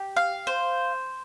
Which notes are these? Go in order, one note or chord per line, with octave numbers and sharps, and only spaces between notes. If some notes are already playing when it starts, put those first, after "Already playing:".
Already playing: G4
F5
C5